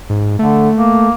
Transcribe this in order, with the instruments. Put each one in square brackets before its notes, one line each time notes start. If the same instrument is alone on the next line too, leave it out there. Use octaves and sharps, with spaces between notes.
[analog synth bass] G#2
[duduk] D3 [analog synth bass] A3
[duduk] A#3